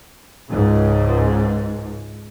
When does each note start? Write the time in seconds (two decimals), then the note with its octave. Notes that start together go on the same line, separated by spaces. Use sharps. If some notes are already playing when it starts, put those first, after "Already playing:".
0.49 C#2 G#2